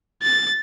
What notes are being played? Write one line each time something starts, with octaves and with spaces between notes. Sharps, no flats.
A6